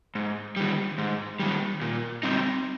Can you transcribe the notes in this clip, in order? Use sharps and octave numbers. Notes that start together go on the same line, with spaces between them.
G#2
D#3 G3
G#2
D#3 G3
A#2
G3 C4 D#4